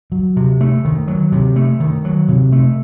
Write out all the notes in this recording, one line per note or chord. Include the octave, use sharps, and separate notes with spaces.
F#3
C3
A3
D#3
F#3
C3
A3
D#3
F#3
C3
A3